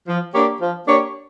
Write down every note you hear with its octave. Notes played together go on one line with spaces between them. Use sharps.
F3
A#3 D4 G4 C#5
F3
A#3 D4 G4 C#5